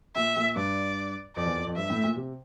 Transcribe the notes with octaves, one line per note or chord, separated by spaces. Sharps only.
A#2 E5
A#2
G2 D5
F2 D5
E2
F2
F2
G2 E5
A2
A#2
C3